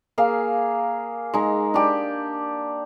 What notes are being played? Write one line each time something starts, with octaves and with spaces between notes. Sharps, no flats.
A#3 G#4 F5
G#3 D#4
D4 G4